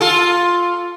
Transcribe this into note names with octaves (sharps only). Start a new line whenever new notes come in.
F4 A4